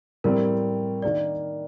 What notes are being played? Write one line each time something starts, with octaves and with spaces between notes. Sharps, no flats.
A2 G3 C4 G4 A#4
D#3 A#3 D4 D5